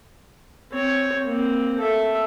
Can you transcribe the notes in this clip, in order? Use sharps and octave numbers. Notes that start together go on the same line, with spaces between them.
C4 C#5
A#3 C4
A4 E5